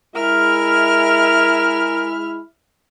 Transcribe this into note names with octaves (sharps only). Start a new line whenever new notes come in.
G#3 E4 A#4 E5 F6